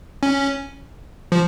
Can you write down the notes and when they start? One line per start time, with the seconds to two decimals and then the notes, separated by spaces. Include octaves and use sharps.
0.23 C#4
1.32 F3